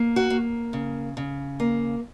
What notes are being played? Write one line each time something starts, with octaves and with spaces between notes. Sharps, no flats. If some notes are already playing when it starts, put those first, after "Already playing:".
Already playing: A#3
F#4
A#3
C#3
C#3
A#3